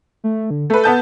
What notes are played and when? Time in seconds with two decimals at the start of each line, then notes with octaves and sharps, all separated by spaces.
0.24 A3
0.50 D3
0.70 A3 A4 B4
0.84 B3 A5 G6